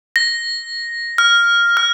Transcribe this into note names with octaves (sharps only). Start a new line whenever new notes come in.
A#6
F6
F6